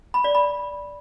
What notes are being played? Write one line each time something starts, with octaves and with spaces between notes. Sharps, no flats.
B5
D5
B5